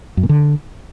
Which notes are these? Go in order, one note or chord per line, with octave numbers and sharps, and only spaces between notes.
F#2
A#2
D3